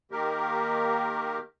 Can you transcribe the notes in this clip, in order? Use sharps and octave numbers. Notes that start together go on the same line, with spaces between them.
D#3 A#3 G4 A#4